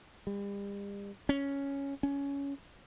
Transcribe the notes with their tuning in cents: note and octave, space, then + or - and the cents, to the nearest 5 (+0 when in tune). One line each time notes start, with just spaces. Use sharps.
G3 +40
C#4 +5
C#4 +15